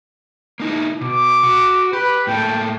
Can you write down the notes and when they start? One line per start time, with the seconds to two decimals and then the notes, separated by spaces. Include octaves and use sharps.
0.60 A#3 D#4 E4
1.01 B2 D6
1.43 F#4
1.93 G4 B4
2.27 A2 A#3 A4 G5